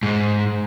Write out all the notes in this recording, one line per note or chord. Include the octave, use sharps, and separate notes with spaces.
G#2